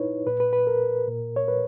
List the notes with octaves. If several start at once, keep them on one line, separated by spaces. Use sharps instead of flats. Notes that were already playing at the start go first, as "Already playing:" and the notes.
Already playing: A#2 D#4 E4 B4 C#5
A#2 B4
B4
B4
A#4
A#2
C#5
B4